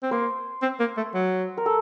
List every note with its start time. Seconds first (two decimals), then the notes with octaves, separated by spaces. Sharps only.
0.03 C4
0.11 A#3 C5
0.62 C4
0.80 A#3
0.97 A3
1.14 F#3
1.57 A#4
1.66 A4